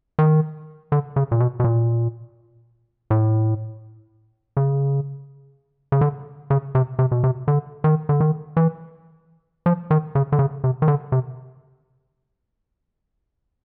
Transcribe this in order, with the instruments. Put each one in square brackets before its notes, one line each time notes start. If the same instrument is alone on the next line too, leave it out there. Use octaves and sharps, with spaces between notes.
[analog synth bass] D#3
D3
C#3
A#2
B2
B2
A#2
A2
C#3
C#3
D3
C#3
C3
C3
B2
C3
D3
D#3
D3
D#3
E3
F3
D#3
C#3
D3
C#3
C3
D#3
D3
C3